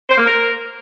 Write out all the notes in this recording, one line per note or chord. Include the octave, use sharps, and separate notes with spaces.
C5
A#3
A#4